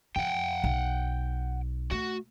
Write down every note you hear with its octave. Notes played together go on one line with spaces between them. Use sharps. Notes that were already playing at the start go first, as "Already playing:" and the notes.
F2 F#5 G5
B1
A3 F#4